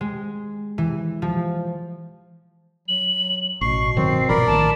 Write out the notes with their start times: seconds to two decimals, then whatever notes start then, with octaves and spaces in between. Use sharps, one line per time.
0.01 G#3
0.78 E3
1.22 F3
2.88 F#3 F#7
3.61 A1 B2 C#6 C7
3.96 G1 D#3 F#3 C4
4.29 G1 A#2 E3 A#4 D5 B5
4.47 A#1 A2 D#3 E3 A5